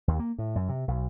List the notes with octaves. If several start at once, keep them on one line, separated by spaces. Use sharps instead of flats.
D#2
A#3
A2
F#2
C3
B1